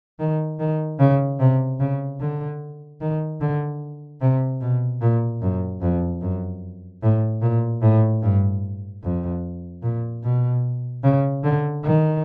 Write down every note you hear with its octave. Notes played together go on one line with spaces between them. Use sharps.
D#3
D#3
C#3
C3
C#3
D3
D#3
D3
C3
B2
A#2
F#2
F2
F#2
A2
A#2
A2
G2
F2
A#2
B2
C#3
D3
D#3